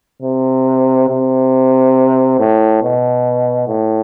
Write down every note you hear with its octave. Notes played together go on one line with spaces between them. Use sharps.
C3
C3
A2
B2
A2